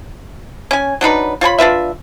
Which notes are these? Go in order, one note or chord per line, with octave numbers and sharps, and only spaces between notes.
C#4 G#5
F#3 D4 D#4 B4
F4 C#5 G#5 B5
D4 F4 B4 E5